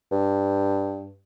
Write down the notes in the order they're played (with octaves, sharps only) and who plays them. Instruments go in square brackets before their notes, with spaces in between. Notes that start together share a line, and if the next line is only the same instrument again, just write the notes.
[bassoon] G2